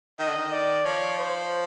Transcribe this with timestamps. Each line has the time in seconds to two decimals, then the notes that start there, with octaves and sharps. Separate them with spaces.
0.19 D#3 D#5
0.27 D3
0.36 D#3
0.52 D5
0.85 F3 C#5
1.18 C5